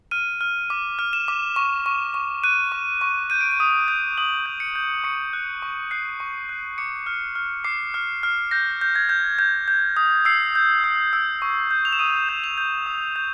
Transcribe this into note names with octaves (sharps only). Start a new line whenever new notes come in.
F6 D#7
F6
D6
F6
E7
D6
C#6
C#6
C#6
F#6 D#7
C#6
C#6
G6 D#7
D7
D#7
D#6
G6
D#6 F#7
G6
C#7
G6
C#6 C#7
F#6
C#6
F#6 C7
C#6
F#6
D6 C#7
F6
F6
D6 C7
F6
F6
G6 A#6
G6
G#6
G6
G6
G6
D#6
E6 C7
G6
E6
E6
C#6
G6
F7
E7
D#6 D#7
G6
F7
G6
D#6
G6